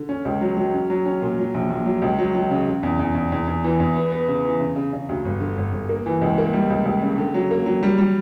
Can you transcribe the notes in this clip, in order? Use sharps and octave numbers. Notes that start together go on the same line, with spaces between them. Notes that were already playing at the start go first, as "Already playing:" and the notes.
Already playing: D3
C#4
C#2
F#3
F#3
C#4
F#3
C#4
A#2
F#3
A#1
A#1
F#3
C#2
F#3
F#3
C#3
C#3
E2
E2
E2
E2
E2
E3
E2
B3
B3
C#3
E3
C#3
C#3
C#3
D2
G1
D3
G1
G1
A#3
E3
C#2
A#3
G3
C#2
C#2
C#3
D3
F#3
A#3
F#3
G3
G3